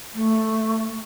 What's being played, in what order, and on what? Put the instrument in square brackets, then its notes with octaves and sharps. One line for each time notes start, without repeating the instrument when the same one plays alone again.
[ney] A3